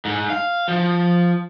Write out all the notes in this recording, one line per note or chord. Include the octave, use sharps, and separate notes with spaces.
G#2
F5
F3